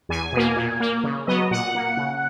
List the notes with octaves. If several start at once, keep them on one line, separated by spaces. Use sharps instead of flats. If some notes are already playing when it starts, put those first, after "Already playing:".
E2 G#5
B2 A#3
A#2
A#3
C#3
F#3 B3 D#5
A#2 F#5
A#3
C#3